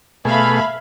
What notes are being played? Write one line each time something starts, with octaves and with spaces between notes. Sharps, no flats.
B2 A3 G#4 E5 F5 B5